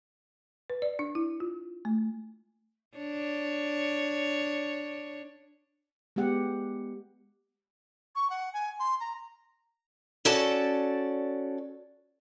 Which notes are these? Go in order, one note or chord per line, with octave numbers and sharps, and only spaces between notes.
B4
D5
D4
E4
F4
A3
D4 C#5
G#3 B3 G4 F#5
C#6
F#5
G#5
C6
A#5
C#4 F#4 A4 D5 A5